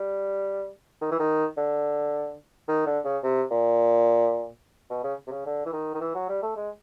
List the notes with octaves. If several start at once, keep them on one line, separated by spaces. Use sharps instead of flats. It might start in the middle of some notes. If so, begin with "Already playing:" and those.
Already playing: G3
D#3
E3
D#3
D3
D#3
D3
C#3
C3
A#2
B2
C#3
C3
C#3
D3
E3
D#3
D#3
E3
F#3
G3
A3
G#3